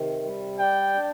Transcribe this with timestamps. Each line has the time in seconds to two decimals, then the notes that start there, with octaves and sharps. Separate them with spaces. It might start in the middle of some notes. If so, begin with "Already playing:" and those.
Already playing: C3 D#3
0.24 G3
0.59 D5 G5
0.94 D4